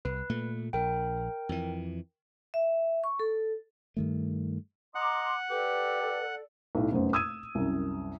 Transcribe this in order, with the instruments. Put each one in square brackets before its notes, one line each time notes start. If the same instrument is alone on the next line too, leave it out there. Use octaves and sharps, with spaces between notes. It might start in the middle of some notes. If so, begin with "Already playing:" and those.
[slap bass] C2 [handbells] B4
[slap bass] A#2 A3
[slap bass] A#1 [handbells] A#4 G5
[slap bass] F2 E3
[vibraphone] E5
C#6
A4
[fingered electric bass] G2 D#3 A3
[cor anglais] D#5 [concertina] F#5 [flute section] A#5 C6 D6
[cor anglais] G4 [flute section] A4 D5 [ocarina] B4
[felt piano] B1 A2
F1 F#2 B3 C5
D#6 E6 G#6 D#7
C2 F#2